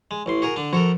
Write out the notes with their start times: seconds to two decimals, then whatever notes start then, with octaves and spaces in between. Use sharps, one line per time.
0.11 G#3
0.26 A1 A2 C6
0.42 F#4 G#4 A#4
0.56 D3 D4
0.73 F3 F#4 A4 A#4